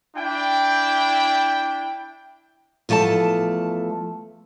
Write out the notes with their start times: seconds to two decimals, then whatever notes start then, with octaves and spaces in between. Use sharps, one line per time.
0.16 D4 E4 G5
2.89 E2 F3 A3 D5 A5